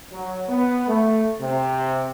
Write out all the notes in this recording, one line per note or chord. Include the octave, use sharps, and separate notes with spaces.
F#3
B3
A3
C3